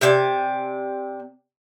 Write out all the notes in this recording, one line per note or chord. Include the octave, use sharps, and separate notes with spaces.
C3 C4 D5 G#5